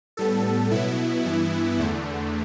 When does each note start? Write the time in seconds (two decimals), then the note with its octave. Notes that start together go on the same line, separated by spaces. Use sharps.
0.17 A2 G3 B3 A4
0.71 B2 F#3 B3 E4
1.25 G2 E3 B3
1.79 E2 D3 A3